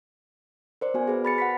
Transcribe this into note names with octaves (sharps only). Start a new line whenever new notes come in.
A#4 C5 D5
B3 F#4 G#5
G#4 B4
B5 A6 C#7
F#5 B5 B6